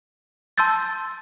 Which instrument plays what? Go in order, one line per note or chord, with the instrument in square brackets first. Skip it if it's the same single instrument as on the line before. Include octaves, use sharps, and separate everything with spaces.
[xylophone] A5 C6 E6 G6 A6